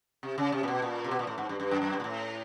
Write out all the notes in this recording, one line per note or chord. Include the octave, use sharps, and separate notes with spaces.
C3
C#3
C3
A#2
B2
A#2
C3
B2
A#2
A2
G#2
G2
G2
F#2
F#2
G2
A#2
A2